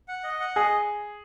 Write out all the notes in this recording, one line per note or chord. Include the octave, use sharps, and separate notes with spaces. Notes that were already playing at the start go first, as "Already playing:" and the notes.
F#5
D#5
F#5
G#4 D#5